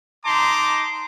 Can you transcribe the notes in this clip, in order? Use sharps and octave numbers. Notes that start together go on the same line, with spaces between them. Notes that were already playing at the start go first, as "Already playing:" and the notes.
D#4 A5 A#5 C6 D6